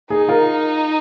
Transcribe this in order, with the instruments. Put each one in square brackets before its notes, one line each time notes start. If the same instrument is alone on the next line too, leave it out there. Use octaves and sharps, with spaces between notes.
[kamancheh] D#4 [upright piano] G#4
[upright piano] F4 A#4